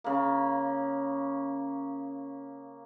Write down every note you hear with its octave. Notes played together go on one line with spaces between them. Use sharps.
C#3 A#3